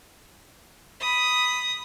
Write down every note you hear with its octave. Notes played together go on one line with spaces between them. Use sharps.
B5 D#6